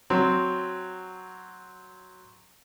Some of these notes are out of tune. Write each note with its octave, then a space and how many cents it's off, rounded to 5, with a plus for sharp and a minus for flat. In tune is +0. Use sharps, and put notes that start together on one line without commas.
F#3 +0 C4 +0